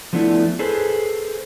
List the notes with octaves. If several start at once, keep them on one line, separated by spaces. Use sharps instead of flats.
F3 A3 B3 D4 E4
G#4 A4 B4 C5